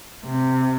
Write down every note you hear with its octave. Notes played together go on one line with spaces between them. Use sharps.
C3